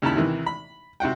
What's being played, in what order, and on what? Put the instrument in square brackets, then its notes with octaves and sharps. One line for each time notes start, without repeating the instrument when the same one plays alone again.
[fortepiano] D#2 C#3 E4 A5 B5
C3 D#3 E3
B5
C3 F#4 F#5 G5